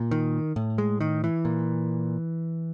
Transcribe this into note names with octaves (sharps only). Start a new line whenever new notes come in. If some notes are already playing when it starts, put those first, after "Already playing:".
Already playing: A#2
D#3
A2
G#3
D#3
E3
A#2